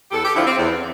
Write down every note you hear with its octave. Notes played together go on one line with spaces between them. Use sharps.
G4
E2 A4
G4
D3 F3 E4
C4
E2